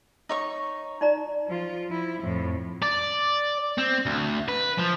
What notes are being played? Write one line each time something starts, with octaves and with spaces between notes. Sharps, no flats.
D#4 C#5 C#6
D#4 D5 A#5
F3 F4
F3 E4
F2 A2
D5
C4
D2
B4
F3